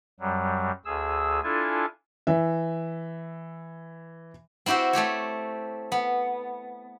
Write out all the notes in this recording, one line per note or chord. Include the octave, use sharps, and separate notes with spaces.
F#2 F#3 G3
D2 G#4 E6
D4 E4 F4 A4 G#5 A5
E3 E5
C4 E4 F#4 G4 C5
A3 C4 G4 C#5
B3